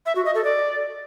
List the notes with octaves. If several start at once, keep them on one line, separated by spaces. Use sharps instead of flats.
E5
F#4
D#5
A4
D5